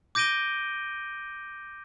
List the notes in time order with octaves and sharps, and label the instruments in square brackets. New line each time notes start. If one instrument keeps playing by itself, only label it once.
[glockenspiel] D6 G6 A#6 D7 D#7 G7